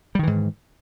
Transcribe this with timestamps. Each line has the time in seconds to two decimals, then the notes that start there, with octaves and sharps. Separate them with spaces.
0.15 G3
0.19 D#3
0.23 E3
0.27 G#2